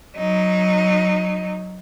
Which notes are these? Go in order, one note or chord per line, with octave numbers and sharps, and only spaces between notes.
F#3 D#4